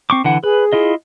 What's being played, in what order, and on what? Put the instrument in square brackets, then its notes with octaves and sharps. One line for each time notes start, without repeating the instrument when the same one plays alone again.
[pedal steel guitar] C4 C#6 D6
D3 E3 F#5
[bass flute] G#4 [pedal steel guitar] B4
[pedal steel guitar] E4 F4 D#5